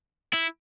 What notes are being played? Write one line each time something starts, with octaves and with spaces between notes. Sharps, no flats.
E4